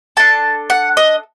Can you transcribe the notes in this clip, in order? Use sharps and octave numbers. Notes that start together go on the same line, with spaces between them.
D4 A4 A5
F#5
D#5